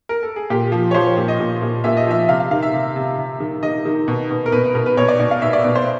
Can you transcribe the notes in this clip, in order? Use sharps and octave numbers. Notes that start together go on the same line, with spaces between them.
A#4
A4
G#4
A#2 G4
F3
C#5
F3 C5
C#5
A#2
D#5
A#2
A#2
A#2 E5
D#5
F3 E5
C3 F5
F5
D#3 F5
E5
C3
C3
C3
D#3
D#3 D#5
D#3
B2
B2
A#4
B2 B4
B4
B2 A#4
B4
B2 C#5
D5
B2 D5
F5
B2 E5
D5
B2 D5
C5